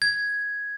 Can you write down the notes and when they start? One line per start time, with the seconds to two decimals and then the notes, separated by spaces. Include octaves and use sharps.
0.02 G#6